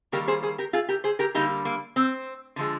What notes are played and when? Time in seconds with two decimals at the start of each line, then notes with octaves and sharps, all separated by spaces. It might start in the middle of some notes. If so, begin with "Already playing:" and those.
0.12 D#3 G3 A#3 G4 A#4
0.28 G#4 C5
0.42 G#4 C5
0.58 G4 A#4
0.73 F4 G#4
0.89 G4 A#4
1.04 G#4 C5
1.19 G4 A#4
1.34 D3 G3 A#3 D#4 G4
1.65 A#3
1.96 C4
2.56 D3 F3 G#3